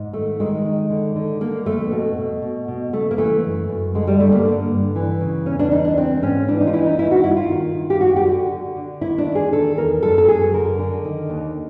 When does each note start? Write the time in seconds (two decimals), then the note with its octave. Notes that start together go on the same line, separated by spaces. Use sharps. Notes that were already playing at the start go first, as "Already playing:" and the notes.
Already playing: G#2
0.13 D#3 A3
0.40 D#3 G#3
0.65 D#3
0.90 D3
1.15 D3
1.41 D3 A#3
1.66 F2 A3
1.91 B2
2.17 B2
2.42 B2
2.68 B2
2.93 C#3 A3
3.11 A#3
3.18 E3 A3
3.44 F#2
3.69 F#2
3.95 D3 G#3
4.07 G3
4.20 G2 A3
4.32 A#3
4.45 D3
4.71 G2
4.96 E3
5.21 C#3
5.46 E2 C#4
5.59 D4
5.71 E3 D#4
5.85 D4
5.97 E3 C4
6.23 G#2 C#4
6.48 E3 D4
6.61 D#4
6.67 F4
6.73 E3 E4
6.86 D#4
6.99 D#3 E4
7.11 F#4
7.24 G2 E4
7.37 F4
7.50 D#3
7.75 D#3
7.90 G4
8.00 F#2 F#4
8.16 G4
8.25 D3 F#4
8.51 D3
8.76 D3
9.01 D#3 E4
9.18 D4
9.27 E2
9.35 G#4
9.52 D#3 A4
9.77 E2 A#4
10.03 F#2 A4
10.18 A4
10.28 F#2 G#4
10.54 D3 A#4
10.79 D3
11.05 D#3
11.30 D#2